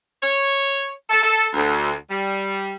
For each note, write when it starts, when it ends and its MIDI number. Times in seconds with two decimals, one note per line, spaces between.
0.22 0.90 73
1.10 1.20 69
1.23 1.46 69
1.54 1.92 38
2.10 2.76 55